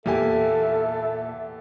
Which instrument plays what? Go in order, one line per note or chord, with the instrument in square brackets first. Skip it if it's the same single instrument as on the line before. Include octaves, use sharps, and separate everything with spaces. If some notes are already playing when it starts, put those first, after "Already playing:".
[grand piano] E2 G4 G#5 [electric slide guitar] A#2 E3 A#3 [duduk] A4 [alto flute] E5